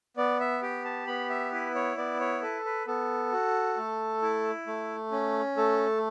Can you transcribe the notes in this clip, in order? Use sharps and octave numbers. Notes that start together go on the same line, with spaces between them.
B3 D5
E5
G4 G5
A5
B3 B5
E5
E4 B4
C#5
B3 D5
C#5
A4 B4
B4
B3 A4
F#4
A3
E4
A3
C#4
A3 A4